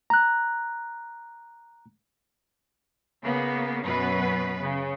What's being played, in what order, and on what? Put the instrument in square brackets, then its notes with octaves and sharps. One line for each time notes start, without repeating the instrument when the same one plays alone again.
[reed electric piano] A#5 F#6
[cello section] C#3 A#3 B3
F#2 B2 B3 B4
C#3